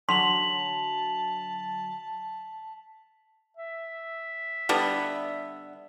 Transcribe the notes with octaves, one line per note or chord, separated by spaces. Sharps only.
D3 F#3 A5 C6 B6 F7 F#7
E5
D3 G3 B3